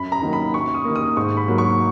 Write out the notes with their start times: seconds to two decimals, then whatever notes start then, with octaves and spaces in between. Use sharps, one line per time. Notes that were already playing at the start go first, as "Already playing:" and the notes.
Already playing: F#2 B5
0.12 A#5
0.22 D#3 F#3 A#3
0.33 B5
0.53 F#2 C#6
0.74 D#6
0.85 D#3 A#3
0.95 D#6
1.17 G#2 C#6
1.37 B5
1.48 F#3 A#3
1.58 C#6